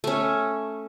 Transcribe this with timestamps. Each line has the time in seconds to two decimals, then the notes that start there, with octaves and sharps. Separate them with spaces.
0.04 A3 C#4